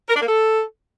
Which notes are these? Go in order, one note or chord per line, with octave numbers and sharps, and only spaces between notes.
A#4
D4
A#3
A4